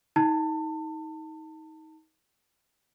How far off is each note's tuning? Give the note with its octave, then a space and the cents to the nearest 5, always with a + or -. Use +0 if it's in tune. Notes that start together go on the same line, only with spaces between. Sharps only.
D#4 +30 A5 +30